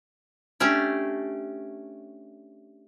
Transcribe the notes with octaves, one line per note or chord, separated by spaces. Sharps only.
A3 C#4 D4 G4